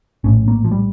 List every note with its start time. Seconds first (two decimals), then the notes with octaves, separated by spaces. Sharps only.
0.24 A#1 A2 C#4
0.48 A#3
0.64 F3
0.71 G3